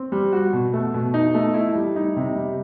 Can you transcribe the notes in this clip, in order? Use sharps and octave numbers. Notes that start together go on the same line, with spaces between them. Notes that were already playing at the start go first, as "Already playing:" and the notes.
Already playing: C4
G3
F#4
B2
A3
B2
D#4
A3
E4
G3
D#4
C3
G3